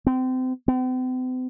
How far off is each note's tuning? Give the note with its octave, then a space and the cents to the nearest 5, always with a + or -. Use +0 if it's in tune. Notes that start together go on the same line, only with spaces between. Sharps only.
C4 -30
C4 -45